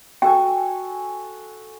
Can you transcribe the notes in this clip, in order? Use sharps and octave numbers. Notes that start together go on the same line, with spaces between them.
F#4 A4 G5 G#5